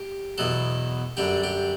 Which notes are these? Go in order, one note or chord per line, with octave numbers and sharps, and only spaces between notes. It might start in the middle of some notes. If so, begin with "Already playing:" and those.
Already playing: G4
E2 B2 F#3 A4
F#2 D3 G3 G4
G4